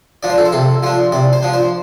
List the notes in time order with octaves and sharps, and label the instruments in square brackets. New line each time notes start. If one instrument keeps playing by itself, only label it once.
[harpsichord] F3 D4 D5
C5
A4
C5
C3 A4
F3 D4 C5
C3 D5
C5
F3 D4
C5